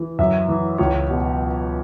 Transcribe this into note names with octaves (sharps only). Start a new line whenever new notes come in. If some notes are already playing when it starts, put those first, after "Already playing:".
Already playing: E3
F#2 E5
E3
C#2 C#5
B2